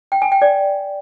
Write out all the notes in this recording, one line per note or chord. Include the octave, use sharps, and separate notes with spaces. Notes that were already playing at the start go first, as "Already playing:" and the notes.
G5
G#5
G5
D5